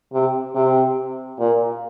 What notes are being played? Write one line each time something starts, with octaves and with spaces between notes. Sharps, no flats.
C3
C3
A#2